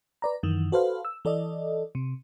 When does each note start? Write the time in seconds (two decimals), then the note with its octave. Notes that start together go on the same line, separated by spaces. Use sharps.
0.22 B4 D5 A#5
0.43 F#2 D#3 E3
0.72 F#4 A4 B4 C5 F5
1.05 E6
1.25 E3 A4 D5 D#5
1.95 C3